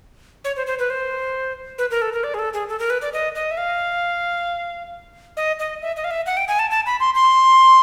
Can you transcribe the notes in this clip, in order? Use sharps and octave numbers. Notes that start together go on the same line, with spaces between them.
C#5
C5
C5
B4
C5
B4
A#4
A4
A#4
D5
G#4
A4
G#4
A4
A#4
B4
D5
D#5
D#5
E5
F5
D#5
D#5
E5
D#5
F5
E5
F#5
G5
G#5
A5
A5
B5
C6
C6